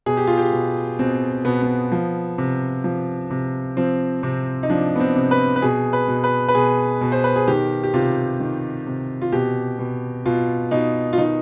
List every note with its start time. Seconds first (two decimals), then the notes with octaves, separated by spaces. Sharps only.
0.06 B2 G#4
0.17 G4
0.27 F4
0.38 G4
0.53 B2
0.99 B2 C4
1.45 B2 B3
1.62 B3
1.92 F3
2.38 C3
2.84 F3
3.31 C3
3.77 F3 C4
4.23 C3 C4
4.63 D#4
4.70 F3 D4
4.96 B3
5.00 C4
5.16 C3
5.31 B4
5.56 B4
5.62 B2 G#4
5.93 B4
6.08 B2
6.24 B4
6.48 B4
6.55 B2 G#4
7.01 B2
7.12 C5
7.24 B4
7.36 G#4
7.48 D#3 G4
7.84 G4
7.94 C3 F4
8.40 D#3
8.86 C3
9.22 F4
9.33 B2 G4
9.79 B2
10.26 B2 F4
10.71 B2 D#4
11.13 F4
11.18 D#3 D#4